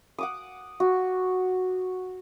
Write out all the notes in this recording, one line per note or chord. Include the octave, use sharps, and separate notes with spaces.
F#5 D6 D#6
F#4